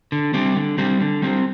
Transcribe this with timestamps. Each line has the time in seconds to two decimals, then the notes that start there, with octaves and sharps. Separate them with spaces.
0.12 D3
0.34 G3 C4 G4
0.56 D3
0.78 G3 C4 G4
1.00 D3
1.22 G3 C4 G4